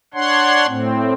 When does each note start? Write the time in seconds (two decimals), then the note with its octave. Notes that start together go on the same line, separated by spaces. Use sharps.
0.14 D4 C#5 F#5 C6
0.66 A2 C4